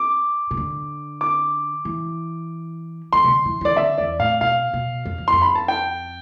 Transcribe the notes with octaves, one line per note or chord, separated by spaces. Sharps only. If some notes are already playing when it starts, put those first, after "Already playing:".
Already playing: D6
C3
D3
D6
E3
E3 C6
C3
D3
E3
E3 D5
D3 E5
E2 D5
A2 F5
B2 F5
B2
F2
E2
F2 C6
B5
A5
G5